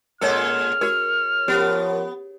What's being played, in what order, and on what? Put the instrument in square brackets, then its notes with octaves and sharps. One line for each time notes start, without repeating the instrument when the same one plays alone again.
[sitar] A#2 G#3 A4 [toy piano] A#4 C#5 [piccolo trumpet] F6
[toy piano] F#4 A#4 [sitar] C#5
[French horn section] F3 A#4 C#5 [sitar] B3 [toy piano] G4